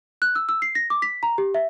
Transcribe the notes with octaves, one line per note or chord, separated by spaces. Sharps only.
F#6
E6
E6
C7
A#6
D6
B6
A#5
G4
E5